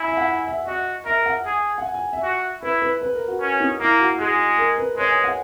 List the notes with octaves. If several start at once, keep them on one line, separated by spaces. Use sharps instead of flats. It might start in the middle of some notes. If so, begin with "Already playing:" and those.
Already playing: E4 G#5
E5
F#5
G#5
E5
F#4 D#5
A#4 E5
F#5
G#4
F#5
G#5
G#5
E5
F#4
E4 B4
B4
B4
A#4
F#4
C#4
D#4
A#3 E4
F#4
G#3 G#4
A#4
B4
G#3 C#5
G#5
F#5